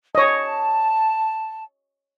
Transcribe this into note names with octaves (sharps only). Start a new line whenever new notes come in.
C#5 D#5 A5